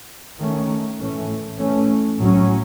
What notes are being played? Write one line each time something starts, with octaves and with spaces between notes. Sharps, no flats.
D#3 A3 C#4
A2 E3 A3 C#4
E3 A3 C#4
A2 F#3 C#4